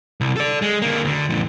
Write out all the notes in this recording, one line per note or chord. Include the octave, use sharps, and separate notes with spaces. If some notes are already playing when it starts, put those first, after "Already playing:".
C2
A4 D5
G#3
D3 A#3
D2 D3
E2 A2